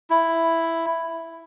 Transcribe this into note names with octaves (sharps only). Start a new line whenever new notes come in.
E4